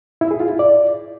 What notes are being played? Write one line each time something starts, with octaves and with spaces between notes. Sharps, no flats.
E4
G#4
F4
E4
D5